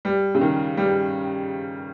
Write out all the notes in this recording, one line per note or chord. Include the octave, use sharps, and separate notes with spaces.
G3
C#3
D#3
G3